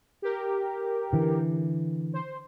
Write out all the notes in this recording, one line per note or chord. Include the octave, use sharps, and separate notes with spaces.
G4 A#4
D3 E3
C5